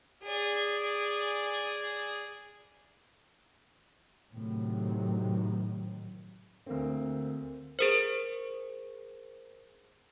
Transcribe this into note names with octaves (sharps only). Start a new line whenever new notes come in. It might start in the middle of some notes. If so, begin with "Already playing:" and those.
G#4 D5
A2 C3 D#3 F#3
D2 A#3 C4
G#4 A#4 C5